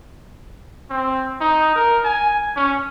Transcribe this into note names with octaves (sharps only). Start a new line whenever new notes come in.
C4
D#4
A#4
G#5
C#4